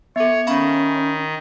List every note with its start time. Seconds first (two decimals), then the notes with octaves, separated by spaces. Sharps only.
0.16 B3 A4 C#5 E5
0.47 D#3 C#4 F5 B5 C#6